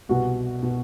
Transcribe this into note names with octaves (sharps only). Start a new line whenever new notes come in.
C2 B2 F#4
B2